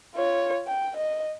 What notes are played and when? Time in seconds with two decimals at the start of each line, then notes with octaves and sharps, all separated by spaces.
0.15 F4 C#5
0.67 G5
0.96 D#5